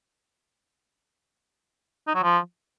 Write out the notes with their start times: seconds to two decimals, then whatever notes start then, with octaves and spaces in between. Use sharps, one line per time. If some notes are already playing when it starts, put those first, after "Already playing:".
2.07 D#4
2.15 F#3
2.23 F3